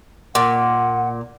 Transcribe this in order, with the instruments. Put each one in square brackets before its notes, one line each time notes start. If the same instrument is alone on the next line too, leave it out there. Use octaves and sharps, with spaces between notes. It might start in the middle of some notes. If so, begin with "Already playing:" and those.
[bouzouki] A#2 [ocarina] F#5